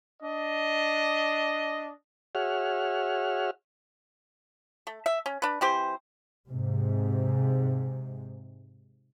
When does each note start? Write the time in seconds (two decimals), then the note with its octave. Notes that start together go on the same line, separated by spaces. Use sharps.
0.22 D4 D#5
2.35 F#4 G#4 C#5 E5 F#5 F6
4.87 A3
5.06 E5
5.26 C#4
5.42 D4 B4
5.61 E3 C4 G4 C5
6.49 G#2 C3